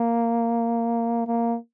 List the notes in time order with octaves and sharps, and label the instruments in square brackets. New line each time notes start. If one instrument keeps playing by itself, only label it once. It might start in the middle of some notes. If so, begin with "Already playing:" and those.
Already playing: [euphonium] A#3
A#3